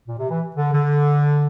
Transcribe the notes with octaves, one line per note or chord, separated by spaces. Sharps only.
A#2
C3
E3
D3
D3